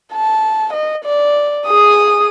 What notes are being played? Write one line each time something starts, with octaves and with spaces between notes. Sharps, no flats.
A5
D#5
D5
G#4 D#6